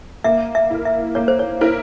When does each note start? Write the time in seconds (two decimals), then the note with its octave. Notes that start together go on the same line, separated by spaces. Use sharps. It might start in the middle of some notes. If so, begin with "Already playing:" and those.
0.24 A#3 E5
0.55 E5
0.70 E4 A#4
0.85 E5
1.15 A#3 C#5
1.28 C5
1.39 C#5
1.61 E4 A#4 C5